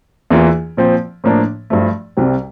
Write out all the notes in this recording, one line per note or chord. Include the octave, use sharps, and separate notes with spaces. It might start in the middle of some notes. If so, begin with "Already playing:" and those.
E2 E3 A#3 F4
A#2 F3 C4
A2 F3 A#3 D4
G2 F3 A3
C2 C3 G3 C4